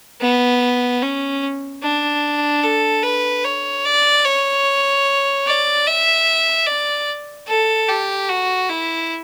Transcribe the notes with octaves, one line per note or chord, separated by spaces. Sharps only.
B3
C#4
D4
A4
B4
C#5
D5
C#5
D5
E5
D5
A4
G4
F#4
E4